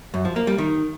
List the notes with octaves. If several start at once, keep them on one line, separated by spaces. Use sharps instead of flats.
F#2
F3
A#3
G3
D#3